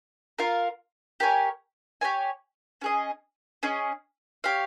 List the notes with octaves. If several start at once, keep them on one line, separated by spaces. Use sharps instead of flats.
F4 A#4 F5
G4 A#4 C#5 G#5
G4 A#4 C#5 G#5
C#4 G#4 D#5
C#4 G#4 D#5
G4 C#5 F5